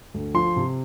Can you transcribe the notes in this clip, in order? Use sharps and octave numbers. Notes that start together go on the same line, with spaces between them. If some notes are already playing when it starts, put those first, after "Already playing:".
D2
F3 C6
C3